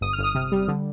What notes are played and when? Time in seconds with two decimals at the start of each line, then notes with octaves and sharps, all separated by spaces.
0.01 G1 D#6
0.13 F6
0.19 G1
0.24 D#6
0.35 C3
0.52 G3
0.68 D3